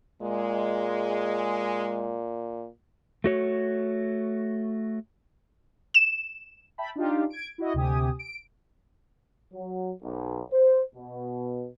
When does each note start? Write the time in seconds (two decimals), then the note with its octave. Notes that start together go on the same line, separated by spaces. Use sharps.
0.22 A#2 G#3
3.24 A3 F#4 C#5
5.94 E7
6.78 E5 G5 A5 B5
6.96 D4 D#4 F4 G4
7.30 G#6 D7
7.58 E4 F#4 D#5
7.74 D2 C3 G4 G#5 D#6
8.19 D7
9.53 F#3
10.03 B1
10.51 C5
10.96 B2